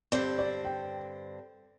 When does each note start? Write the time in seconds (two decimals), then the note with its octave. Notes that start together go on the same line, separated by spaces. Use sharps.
0.12 G2 D3 C4 D5
0.38 D5
0.64 G5